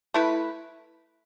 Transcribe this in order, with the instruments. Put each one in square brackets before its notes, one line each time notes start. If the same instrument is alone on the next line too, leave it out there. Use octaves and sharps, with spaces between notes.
[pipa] A3 E4 B4